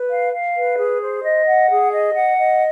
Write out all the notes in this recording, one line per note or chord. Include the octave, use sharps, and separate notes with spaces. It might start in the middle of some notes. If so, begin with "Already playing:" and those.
Already playing: B4
F5
F5
B4
G#4
C5
D#5
F#5
G#4
D#5
F#5
D#5